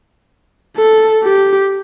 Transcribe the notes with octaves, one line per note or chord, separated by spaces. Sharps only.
A4
G4